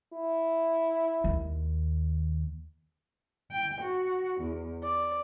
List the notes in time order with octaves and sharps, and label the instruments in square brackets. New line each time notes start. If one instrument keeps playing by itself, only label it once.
[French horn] E4
[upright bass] D#2
[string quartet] G5
F#4
E2
D5